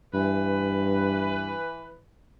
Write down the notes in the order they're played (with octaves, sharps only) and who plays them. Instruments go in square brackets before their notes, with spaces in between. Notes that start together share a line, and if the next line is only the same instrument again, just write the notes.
[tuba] G2 [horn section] E3 B4